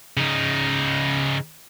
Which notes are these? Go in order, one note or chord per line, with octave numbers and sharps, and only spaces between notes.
C#3 D#4